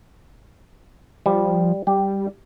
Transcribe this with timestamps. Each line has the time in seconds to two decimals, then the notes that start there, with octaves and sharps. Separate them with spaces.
1.26 F3 G3
1.87 G3 G4